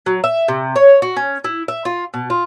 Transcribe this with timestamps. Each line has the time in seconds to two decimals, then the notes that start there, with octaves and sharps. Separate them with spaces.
0.06 F#3
0.24 E5
0.48 C3
0.76 C#5
1.02 F#4
1.17 C#4
1.44 E4
1.68 E5
1.85 F4
2.14 B2
2.30 F4